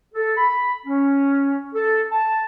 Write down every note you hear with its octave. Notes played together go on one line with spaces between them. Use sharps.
A4
B5
C#4
A4
A5